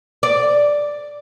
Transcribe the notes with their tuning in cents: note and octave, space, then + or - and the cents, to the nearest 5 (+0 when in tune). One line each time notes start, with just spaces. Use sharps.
D5 +0